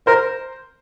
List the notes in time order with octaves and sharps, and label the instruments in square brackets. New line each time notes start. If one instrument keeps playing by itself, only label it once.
[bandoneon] A#4 [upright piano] C5